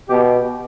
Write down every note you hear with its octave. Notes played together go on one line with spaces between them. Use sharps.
B2 G4